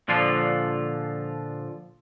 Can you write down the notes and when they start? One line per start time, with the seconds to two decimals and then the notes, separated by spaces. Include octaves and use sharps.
0.08 A#2 D3 F3 F4